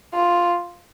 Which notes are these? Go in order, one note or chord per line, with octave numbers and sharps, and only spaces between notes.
F4